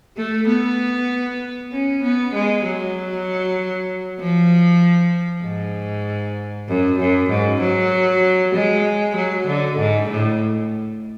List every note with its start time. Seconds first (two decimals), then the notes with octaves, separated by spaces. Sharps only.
0.17 A3
0.47 B3
1.72 C#4
2.03 B3
2.34 G#3
2.65 F#3
4.20 F3
5.44 G#2
6.68 F#2
6.99 F#2
7.30 G#2
7.61 F#3
8.55 G#3
9.16 F#3
9.47 D3
9.78 G#2
10.10 A2